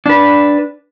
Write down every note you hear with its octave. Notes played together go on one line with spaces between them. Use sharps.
D4 B4